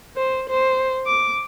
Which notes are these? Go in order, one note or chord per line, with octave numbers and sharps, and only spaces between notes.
C5
C5
D6